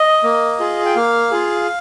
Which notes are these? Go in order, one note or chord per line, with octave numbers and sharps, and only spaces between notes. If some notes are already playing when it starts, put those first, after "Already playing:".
Already playing: D#5
A#3
F4 G#4
G5
A#3 F5
F4 G#4